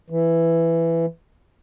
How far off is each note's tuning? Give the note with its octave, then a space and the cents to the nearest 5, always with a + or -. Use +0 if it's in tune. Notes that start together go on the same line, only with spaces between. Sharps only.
E3 +10